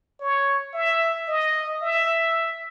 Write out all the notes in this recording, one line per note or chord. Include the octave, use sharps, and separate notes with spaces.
C#5
E5
D#5
E5